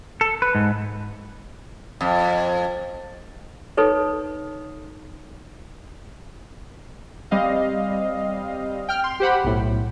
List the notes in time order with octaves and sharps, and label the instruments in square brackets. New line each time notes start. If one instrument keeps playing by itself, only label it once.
[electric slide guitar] A4
B4
G#2
[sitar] F2
[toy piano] D#4 A4 B4 C#5
[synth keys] G3 C4 D#5 F5
G5 F6
C6
G4 C5 F#5 B5
B1 A2